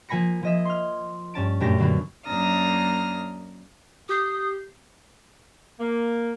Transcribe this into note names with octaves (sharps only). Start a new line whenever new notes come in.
F3 A#3 G#5 B5 A#6 C#7
F3 D#5 E5
C6 F6
G2 C#4 A5 D7
F#2 A#2 A3 D4 G4 A#6
D3 F#3 A#3 B3
F#2 A#3 D4 A#5 D#6 F6
G4 D#6 G6 C7
A#3